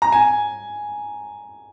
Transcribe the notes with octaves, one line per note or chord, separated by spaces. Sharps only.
A#5
G#5